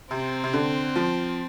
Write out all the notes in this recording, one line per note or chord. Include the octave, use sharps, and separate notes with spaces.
C3 C4
C3
D3
F3